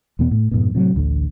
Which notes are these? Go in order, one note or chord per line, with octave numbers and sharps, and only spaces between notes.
E2 B2 B3
A2
F2 G#2 B2
A2 C3 F3 F#3
A1 D2 D3